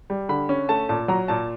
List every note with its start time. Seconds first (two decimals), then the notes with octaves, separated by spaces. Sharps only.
0.10 G3
0.29 D3 B5
0.49 C#4
0.69 A3 A5
0.89 A#2 A5
1.08 F#3 A#5
1.28 A#2 A5